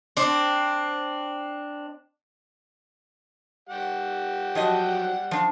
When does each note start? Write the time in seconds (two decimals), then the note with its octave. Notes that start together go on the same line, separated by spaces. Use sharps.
0.17 C4 D4
3.69 G3 G4 F#5
4.55 F3 F#3 D#5
5.31 F3 D4